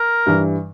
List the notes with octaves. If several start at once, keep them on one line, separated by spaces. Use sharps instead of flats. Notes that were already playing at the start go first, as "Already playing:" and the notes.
Already playing: A#4
G2 E3